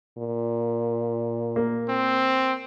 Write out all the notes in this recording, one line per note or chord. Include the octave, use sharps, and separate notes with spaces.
A#2
A#3
C4